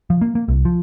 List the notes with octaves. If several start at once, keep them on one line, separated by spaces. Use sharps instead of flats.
F3
A#3
A#3
C2
F3